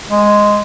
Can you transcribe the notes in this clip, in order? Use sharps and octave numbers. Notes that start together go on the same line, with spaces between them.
G#3